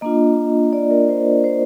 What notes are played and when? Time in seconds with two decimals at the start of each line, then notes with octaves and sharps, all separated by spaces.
0.01 A#3 D4 F4 D#5
0.73 D5
0.90 A#4
1.09 C5
1.44 C5